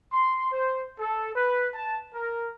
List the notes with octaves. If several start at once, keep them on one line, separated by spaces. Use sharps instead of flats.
C6
C5
A4
B4
A5
A#4